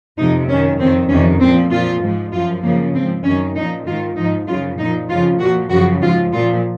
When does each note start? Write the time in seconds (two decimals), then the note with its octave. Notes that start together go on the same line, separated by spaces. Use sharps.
0.17 F2 C3 F3 D#4
0.48 F#2 D#3 C#4
0.79 F2 D#3 C4
1.09 F2 C3 D#3 C#4
1.40 A#2 F3 C4
1.71 A#2 F3 F4
2.02 G#2 F3
2.32 F#2 F3 F4
2.63 F#2 C#3 F3 A#3
2.94 G#2 F3 C4
3.24 F#2 D#3 C#4
3.55 A#2 F3 D#4
3.85 G#2 D#3 F4
4.16 G#2 F3 D#4
4.47 F#2 C#3 F3 F4
4.77 A#2 F3 D#4
5.08 F2 C#3 F3 F4
5.39 A#2 F3 F#4
5.70 F#2 C#3 F3 F#4
6.00 G#2 F3 F4
6.32 A#2 F3 F4